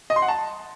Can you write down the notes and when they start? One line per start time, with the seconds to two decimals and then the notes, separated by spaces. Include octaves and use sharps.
0.10 D#5
0.16 C6
0.22 F#5
0.28 A5